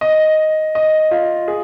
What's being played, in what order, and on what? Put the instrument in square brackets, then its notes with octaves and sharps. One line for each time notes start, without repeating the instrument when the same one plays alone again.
[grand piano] D#5
D#5
F4
G#4